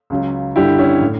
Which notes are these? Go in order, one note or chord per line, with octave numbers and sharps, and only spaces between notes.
C#2 C#3 F#3
G2 D3 G3 E4 G4
C#4 E4
A2